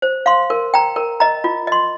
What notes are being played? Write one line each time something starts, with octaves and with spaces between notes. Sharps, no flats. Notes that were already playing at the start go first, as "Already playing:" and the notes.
C5
F5 C6
A#4
G5 A#5
A#4
D#5 A#5
F4
D#5 C6